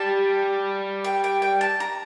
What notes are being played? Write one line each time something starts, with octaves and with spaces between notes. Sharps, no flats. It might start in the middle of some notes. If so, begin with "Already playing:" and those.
Already playing: G3 A5
G5
G5
G5
A5
A#5